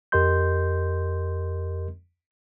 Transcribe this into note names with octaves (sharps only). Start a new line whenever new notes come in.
F2 G4 A#4 D#5 C6 G6